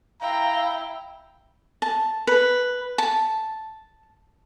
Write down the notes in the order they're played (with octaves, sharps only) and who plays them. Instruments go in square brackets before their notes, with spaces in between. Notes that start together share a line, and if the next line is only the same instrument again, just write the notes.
[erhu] E4 [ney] F5 [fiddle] G5 [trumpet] A#5
[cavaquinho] A5
B4
A5